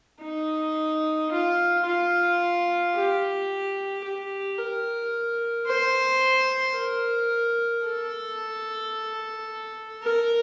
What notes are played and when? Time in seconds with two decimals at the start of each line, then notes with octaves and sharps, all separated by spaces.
0.22 D#4
1.32 F4
1.86 F4
2.95 G4
4.05 G4
4.59 A#4
5.67 C5
6.76 A#4
7.86 A4
10.04 A#4